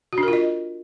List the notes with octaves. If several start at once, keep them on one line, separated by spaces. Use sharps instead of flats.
F#4
D4
A#4
F4
D#5